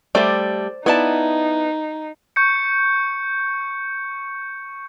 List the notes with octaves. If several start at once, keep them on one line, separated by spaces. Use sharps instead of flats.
G3 A3 C5 D5
B3 D#4 E4 D5 A5
C#6 G6 C#7